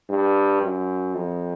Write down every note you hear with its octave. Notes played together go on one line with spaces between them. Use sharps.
G2
F#2
F2